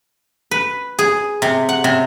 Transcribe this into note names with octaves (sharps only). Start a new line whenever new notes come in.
B4
G#4
C3
F#5
C3